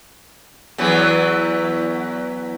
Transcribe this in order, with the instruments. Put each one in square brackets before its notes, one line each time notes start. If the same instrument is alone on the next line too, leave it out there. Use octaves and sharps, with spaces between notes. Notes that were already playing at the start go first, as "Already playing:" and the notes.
[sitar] E2 E3 F#3